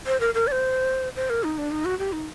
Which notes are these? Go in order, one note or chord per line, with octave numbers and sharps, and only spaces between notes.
C5
A#4
A#4
D5
C5
C5
A#4
D#4
D4
D#4
F#4
G4
D#4